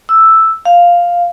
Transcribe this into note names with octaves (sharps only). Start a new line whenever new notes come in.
E6
F5